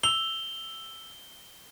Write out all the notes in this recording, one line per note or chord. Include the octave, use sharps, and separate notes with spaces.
E6 F7 G7